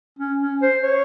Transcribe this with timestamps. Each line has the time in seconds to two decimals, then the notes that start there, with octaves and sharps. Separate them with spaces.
0.19 C#4
0.41 C#4
0.62 C5
0.83 C#5